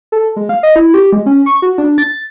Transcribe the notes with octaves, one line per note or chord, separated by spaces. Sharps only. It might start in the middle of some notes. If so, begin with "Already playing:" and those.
A4
G#3
F5
D#5
E4
G4
G#3
C#4
C#6
F#4
D4
A6